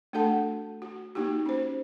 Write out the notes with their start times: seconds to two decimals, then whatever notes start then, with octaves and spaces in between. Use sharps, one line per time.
0.13 A3 D4 F#4 A4 F#5 A5
0.82 F#4
1.15 A#3 D#4 F#4 G4
1.46 C#4 C5